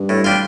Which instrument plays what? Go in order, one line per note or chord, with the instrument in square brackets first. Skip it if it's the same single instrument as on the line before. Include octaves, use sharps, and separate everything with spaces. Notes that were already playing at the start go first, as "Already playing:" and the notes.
Already playing: [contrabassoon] G2
[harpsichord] A2
G3 D4 F4